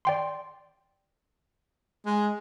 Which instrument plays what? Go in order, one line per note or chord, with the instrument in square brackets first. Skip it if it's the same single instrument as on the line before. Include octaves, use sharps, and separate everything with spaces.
[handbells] D5 G5 C6
[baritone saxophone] G#3